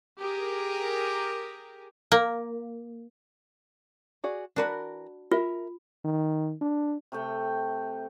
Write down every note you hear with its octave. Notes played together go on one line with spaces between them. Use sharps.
G4 G#4 A#4
A#3
F#4 G#4 D5
E3 D4 F#4 A#4 B4 B5
F4 A#4 E5
D#3
D4
C3 A3 G5